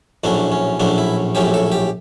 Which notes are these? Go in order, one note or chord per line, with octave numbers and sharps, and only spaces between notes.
A#1 A2 F#3 A3 C#4 D4
C#4
A#1 A2 F#3 A3 C#4 D4
E4
A#1 A2 F#3 A3 C#4 G4
A4
G4